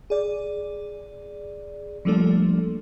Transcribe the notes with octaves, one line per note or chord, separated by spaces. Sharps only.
G#4 D5
F3 G3 A3 A#3 D4 A4